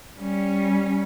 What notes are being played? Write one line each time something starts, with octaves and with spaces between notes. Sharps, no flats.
G3 C#4